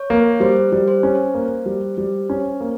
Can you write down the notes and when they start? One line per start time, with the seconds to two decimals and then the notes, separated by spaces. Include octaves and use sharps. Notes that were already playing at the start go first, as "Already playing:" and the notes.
Already playing: C#5
0.10 A#3
0.40 G3 C5
0.72 G3
0.88 C5
1.03 C#4
1.34 A#3
1.66 G3
1.98 G3
2.30 C#4
2.61 A#3